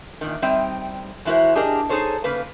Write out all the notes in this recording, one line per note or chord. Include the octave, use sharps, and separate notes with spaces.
E2 A#2 D#3
G3 C4 D#4 E5 G5
E3 G#3 E4 F#4 A#4 C5
D4 G4 G#4 A#4 D#5
D#4 G#4 A4 C5 C#5
C#3 A#3 B4